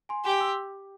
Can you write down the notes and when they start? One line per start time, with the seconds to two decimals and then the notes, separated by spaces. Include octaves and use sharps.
0.09 G#5 C6
0.25 G4 G#5 C6
0.40 C6 E6